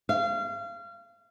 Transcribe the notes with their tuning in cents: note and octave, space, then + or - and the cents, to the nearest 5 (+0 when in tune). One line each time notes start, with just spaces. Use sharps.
F5 -30